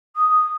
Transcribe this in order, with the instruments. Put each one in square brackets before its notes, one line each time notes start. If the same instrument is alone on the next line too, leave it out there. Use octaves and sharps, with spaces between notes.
[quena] D#6